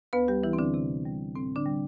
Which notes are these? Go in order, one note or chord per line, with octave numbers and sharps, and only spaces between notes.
D2 B3 B4
G3 G4
D2 E3 E4
C4
D3 D4
C3
G3
A2 C4
D3 D4
G3